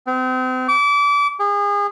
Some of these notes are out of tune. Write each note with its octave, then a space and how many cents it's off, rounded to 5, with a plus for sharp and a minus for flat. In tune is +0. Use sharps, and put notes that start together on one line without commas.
C4 -35
D6 -30
G#4 -35